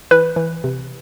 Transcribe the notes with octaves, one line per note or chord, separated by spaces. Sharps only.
E3 B4
E3
C3